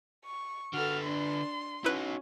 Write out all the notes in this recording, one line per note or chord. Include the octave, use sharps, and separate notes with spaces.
C#6
D3 F#4 A4 B4 F6
D4 C6
C#4 D#4 E4 F#4 B4